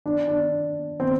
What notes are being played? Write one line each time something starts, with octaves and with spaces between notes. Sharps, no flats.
D4
D4
C4